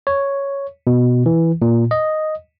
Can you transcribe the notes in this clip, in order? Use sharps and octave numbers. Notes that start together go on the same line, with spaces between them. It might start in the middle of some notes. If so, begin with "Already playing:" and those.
C#5
B2
E3
A#2
D#5